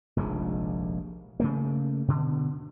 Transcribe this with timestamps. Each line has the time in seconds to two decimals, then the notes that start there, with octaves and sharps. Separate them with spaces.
0.16 F1 A#1 D#2 G#3
1.40 C#3 A3 A#3
2.08 B2 D3